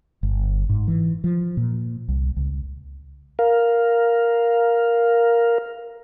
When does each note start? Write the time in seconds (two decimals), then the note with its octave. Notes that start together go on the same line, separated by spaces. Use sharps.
0.23 G1
0.69 G#2
0.88 E3
1.24 F3
1.57 A#2
2.08 C2
2.37 C#2
3.39 A#4 F5